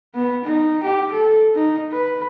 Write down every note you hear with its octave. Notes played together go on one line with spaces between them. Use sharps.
B3
D#4
G4
A4
D#4
B4